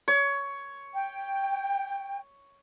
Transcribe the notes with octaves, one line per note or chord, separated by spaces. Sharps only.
C#5
G5